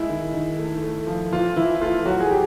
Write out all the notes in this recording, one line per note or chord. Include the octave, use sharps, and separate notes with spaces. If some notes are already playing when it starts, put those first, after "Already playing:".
Already playing: G#3 E4
D#3
D#3
A3
A3
F3
E3 F4
E3 E4
A3 F4
F#3 F#4
G#4
G4